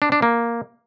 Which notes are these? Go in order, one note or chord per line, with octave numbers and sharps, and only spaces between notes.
D4
D4
A#3